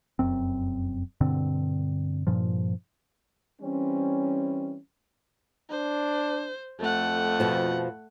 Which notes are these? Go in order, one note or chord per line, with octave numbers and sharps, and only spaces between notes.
F1 F#2 C4
G2 B2 D3 C4
G2 A#2 F3
E3 G3 C4 C#4
D4 C5
F2 A3 F#5
B2 F3